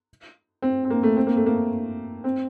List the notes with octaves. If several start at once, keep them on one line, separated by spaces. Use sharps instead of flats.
C4
C4
A#3
A3
C4
A#3
A3
A#3
C4